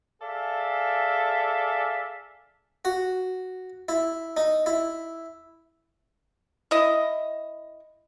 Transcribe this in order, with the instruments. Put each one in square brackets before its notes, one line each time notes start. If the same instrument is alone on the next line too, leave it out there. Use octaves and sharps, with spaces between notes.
[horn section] G#4 A4 D5 E5 F5
[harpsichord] F#4
E4
D#4
E4
[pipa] E4 D#5